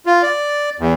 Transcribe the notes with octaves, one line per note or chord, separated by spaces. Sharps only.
F4
D5
E2